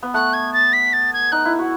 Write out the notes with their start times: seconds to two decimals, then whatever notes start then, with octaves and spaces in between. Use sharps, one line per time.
0.03 B3
0.14 A3 F#6
0.33 G#6
0.53 A6
0.73 B6
0.93 A6
1.13 G#6
1.32 D#4 F#6
1.45 E4
1.59 F#4